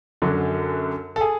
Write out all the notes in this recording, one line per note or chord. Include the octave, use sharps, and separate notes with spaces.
F#2 D3 F#3
A4
G#4